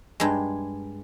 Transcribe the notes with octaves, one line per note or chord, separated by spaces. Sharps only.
G2 G#3